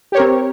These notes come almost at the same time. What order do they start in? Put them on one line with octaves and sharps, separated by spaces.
G4 C#5 A#4 C4